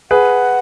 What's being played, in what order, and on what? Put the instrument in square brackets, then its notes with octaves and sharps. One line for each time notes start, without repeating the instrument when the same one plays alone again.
[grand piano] G#4 B4 [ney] F#5